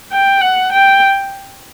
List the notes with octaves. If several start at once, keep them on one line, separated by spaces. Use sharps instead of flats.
G5
F#5
G5